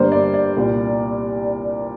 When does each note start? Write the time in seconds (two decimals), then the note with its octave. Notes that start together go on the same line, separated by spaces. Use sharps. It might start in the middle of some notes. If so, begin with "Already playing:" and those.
Already playing: G1 G2 G3 A#3 C5
0.12 D5
0.34 D5
0.56 C2 A#2 A#3